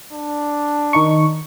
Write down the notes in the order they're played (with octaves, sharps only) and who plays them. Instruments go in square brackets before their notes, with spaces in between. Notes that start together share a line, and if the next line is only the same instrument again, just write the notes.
[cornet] D4
[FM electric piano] D#3 D#4 C#6